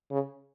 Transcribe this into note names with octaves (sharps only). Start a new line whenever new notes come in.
C#3